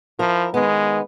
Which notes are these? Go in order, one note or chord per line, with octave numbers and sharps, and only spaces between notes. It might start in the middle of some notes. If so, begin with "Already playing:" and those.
F3 E4 A#4
D#3 G#3 B3